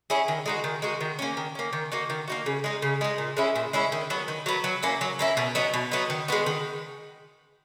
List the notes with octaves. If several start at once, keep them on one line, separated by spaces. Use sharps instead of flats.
C#4 E4 G#4
D#3
G#3 D#4 F#4
D#3
G#3 D#4 F#4
D#3
A#3 C#4
D#3
A#3 C#4
D#3
A#3 D#4 F#4
D#3
A#3 D#4 F#4
C#3
G#3 D#4
C#3
G#3 D#4
A#2
G#3 C#4 E4
A#2
G#3 C#4 E4
D#3
F#3 B3
D#3
F#3 B3
F#3
A#3 C#4 E4
F#3
A#3 C#4 E4
B2
F#3 B3 D#4
B2
F#3 B3 D#4
D#3
G#3 B3 F#4
D#3